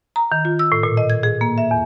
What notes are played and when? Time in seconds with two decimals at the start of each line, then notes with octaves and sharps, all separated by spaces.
0.16 A#5
0.32 D#3
0.45 F4
0.59 E6
0.72 A2
0.83 A#2
0.97 D#5
1.10 G#6
1.23 G#4
1.41 A#3
1.58 E5
1.71 E2